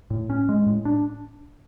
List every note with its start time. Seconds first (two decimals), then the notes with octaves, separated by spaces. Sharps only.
0.10 A2
0.30 C#4
0.49 G#3
0.67 A2
0.85 D4